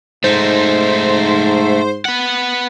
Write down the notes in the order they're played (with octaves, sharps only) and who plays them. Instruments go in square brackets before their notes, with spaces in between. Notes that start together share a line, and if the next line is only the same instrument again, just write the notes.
[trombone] G#2 [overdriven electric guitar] A3 D#4 [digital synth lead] C5
[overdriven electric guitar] B4 F#5